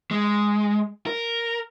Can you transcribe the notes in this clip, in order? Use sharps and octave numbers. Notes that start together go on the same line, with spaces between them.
G#3
A#4